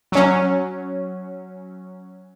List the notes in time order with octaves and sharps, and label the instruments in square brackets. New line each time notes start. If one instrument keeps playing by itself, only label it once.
[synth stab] F#3 C#4